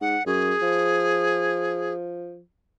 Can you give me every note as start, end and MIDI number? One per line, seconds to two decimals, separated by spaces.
0.01 0.17 44
0.01 0.23 78
0.26 0.54 42
0.26 1.94 68
0.62 2.41 53